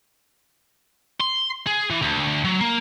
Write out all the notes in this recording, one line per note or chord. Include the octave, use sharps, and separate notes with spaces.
C6
G#4
E3
D2
F#3
A#3